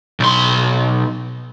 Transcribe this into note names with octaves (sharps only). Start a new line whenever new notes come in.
B1 C6